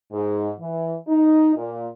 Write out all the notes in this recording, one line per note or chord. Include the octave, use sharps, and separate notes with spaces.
G#2
E3
D#4
A#2